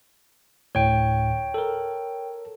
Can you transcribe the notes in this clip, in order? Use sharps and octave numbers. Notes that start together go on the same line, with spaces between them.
D2 A2 C#5 G5
A4 A#4